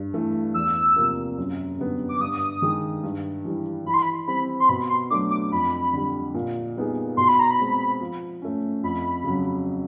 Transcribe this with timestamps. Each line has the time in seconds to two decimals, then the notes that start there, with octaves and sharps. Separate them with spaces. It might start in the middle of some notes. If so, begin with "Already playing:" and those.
Already playing: G2
0.14 E3 A3
0.54 E2 E6
0.96 C3 F3 A#3
1.38 F#2
1.79 D3 G3 B3
2.09 D6
2.20 G2 D#6
2.62 D#3 G#3
3.03 G2
3.45 E3 G3
3.86 E3 B5
3.94 C6
4.02 B5
4.27 G3 C4 B5
4.60 C6
4.69 B2 B5
4.89 C6
5.10 F#3 A3 D4 D6
5.31 D6
5.52 F2 B5
5.93 D3 G3
6.35 A#2
6.76 G3 B3 D#4 G#4
7.17 B2 C6
7.28 B5
7.39 A#5
7.51 B5
7.60 G#3 C4
8.00 F3
8.42 A3 C#4
8.83 F2 B5
9.24 C#3 F#3